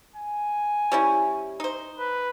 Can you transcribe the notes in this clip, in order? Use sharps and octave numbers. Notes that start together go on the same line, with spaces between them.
G#5
G3 C#4 E4
D#4 C5
B4